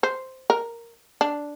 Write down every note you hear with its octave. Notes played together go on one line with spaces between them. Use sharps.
C5
A#4
D4